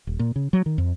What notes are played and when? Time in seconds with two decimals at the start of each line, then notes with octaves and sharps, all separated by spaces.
0.07 D#1
0.19 A#2
0.36 C#3
0.53 F#3
0.66 D#3
0.78 F2